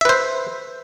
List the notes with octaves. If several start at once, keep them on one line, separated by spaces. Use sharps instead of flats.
B4 C5 E5